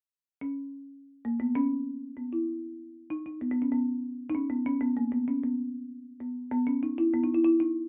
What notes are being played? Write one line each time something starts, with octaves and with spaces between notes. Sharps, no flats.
C#4
A#3
B3
C#4
B3
E4
D#4
D#4
B3
B3
C#4
B3
D#4
C#4
B3
C#4
B3
A#3
B3
C#4
B3
B3
B3
C#4
D#4
E4
B3
D#4
E4
E4
D#4